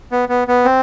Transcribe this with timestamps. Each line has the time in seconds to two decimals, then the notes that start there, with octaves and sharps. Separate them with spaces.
0.12 B3
0.29 B3
0.48 B3
0.65 C4